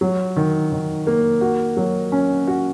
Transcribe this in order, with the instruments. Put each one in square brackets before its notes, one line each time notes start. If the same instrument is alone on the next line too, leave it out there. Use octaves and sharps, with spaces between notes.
[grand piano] F#3
D#3
D#3
A#3
F#4
F#3
C#4
F#4